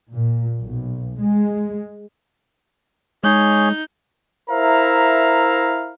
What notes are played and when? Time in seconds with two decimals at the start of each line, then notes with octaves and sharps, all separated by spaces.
0.12 A#2
0.62 B1
1.21 G#3
3.24 G#3 D#4 G#4 C#5 G6
4.50 E4 A#4 C5 E5 F5 A#5